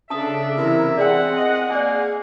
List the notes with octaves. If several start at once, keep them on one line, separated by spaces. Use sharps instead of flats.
C#3 D4 A4 E5 A5 D#6
C3 E3 E4 A#4
C4 G#4 D5 F#5 G5
D#5
A#3 D5 G#5